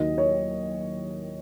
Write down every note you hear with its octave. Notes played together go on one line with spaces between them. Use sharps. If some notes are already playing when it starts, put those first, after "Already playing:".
Already playing: D#2 D#3 F#3 D#5
C#5